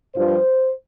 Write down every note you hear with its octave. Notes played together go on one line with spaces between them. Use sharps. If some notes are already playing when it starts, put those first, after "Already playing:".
G2 F3 C5